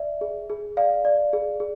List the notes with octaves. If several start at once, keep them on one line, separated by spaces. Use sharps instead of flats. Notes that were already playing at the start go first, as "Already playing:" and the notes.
Already playing: D5 E5
G#4
G#4
D5 F5
D5
G#4
G#4